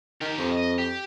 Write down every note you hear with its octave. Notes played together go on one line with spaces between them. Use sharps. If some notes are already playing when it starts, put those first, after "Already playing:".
D#3 G4 A#4
F2
D#5
G4